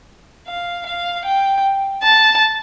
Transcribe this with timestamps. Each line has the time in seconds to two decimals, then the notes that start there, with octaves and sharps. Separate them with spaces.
0.47 F5
0.86 F5
1.25 G5
2.03 A5